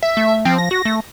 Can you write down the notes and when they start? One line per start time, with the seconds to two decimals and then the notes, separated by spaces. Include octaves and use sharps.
0.03 E5
0.17 A3
0.45 F3 C4
0.58 A#6
0.71 F#4
0.85 A3